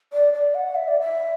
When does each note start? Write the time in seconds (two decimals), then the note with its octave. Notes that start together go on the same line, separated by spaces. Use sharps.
0.13 D5
0.34 D5
0.54 F#5
0.75 E5
0.88 D5
1.01 E5